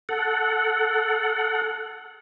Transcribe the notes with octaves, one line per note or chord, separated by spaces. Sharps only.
A4 F#5